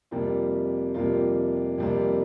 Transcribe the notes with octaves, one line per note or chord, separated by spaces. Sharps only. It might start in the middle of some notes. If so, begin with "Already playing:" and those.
F2 C3 G3 A#3 F4
F2 C3 G3 A#3 F4
F2 C3 G3 A#3 F4